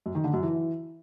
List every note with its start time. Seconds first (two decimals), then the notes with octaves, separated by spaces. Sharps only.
0.06 F#2
0.15 D#3
0.24 D3
0.33 F#2
0.43 E3